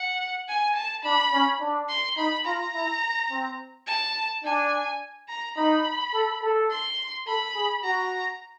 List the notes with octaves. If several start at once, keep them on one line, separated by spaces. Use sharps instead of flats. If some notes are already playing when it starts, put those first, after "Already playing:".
Already playing: F#5
G#5
A5
D4 B5
C#4
D4
C6
D#4 B5
F4 A#5
E4
C4
A5
D4 G#5
A#5
D#4 B5
A4
A4
C6
A4 B5
G#4
F#4 A#5